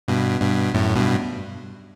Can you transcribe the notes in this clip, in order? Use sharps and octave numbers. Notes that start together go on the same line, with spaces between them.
G2 B2
G2 B2
F#2 A2
G2 B2